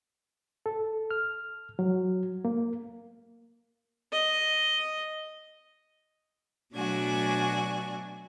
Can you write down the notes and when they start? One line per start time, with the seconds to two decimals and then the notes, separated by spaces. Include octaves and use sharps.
0.66 A4
1.11 F6
1.79 F#3
2.45 A#3
4.12 D#5
6.75 B2 F#3 A3 D4 F#4 G#5